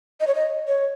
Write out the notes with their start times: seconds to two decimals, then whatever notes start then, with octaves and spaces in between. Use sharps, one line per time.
0.20 D#5
0.27 C#5
0.35 D#5
0.67 C#5